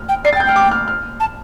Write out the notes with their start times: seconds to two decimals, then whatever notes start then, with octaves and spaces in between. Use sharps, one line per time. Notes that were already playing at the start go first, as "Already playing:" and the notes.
Already playing: F6
0.09 G5
0.25 D5 C7
0.33 G5 A6
0.40 G6
0.46 G5 F6
0.56 D6
0.71 F6
0.88 F6
1.20 A5